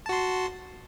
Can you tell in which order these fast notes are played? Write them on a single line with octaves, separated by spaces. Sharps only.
A5 F#4 C6